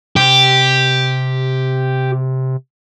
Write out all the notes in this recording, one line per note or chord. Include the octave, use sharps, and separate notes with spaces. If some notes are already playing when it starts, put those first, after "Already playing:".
C3 G4